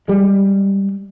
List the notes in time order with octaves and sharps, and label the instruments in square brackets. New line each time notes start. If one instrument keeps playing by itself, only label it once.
[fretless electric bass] G3 G#3